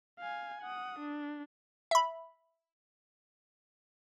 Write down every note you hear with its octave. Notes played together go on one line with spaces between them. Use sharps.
F5 G#5
F#5 D#6
D4
E5 B5